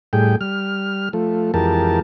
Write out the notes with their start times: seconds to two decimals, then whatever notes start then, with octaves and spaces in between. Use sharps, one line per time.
0.13 A2 G3 G#4 G5
0.41 G3 F6
1.13 F3 A3
1.54 F2 E3 G#3 G4 A#4 A5